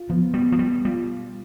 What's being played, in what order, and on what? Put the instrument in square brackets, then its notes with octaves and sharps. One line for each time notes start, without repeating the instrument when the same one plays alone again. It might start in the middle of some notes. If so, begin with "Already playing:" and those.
Already playing: [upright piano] F4
[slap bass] F3 [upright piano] B3
[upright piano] B2 [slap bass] G3
[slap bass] F3
[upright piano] B2 [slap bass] G3
[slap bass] G3 [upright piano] F4